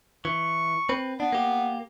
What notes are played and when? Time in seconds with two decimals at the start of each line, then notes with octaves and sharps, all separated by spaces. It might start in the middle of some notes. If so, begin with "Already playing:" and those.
0.25 E3 C#6
0.89 C4 B4
1.20 B3 D4
1.32 A#3 G4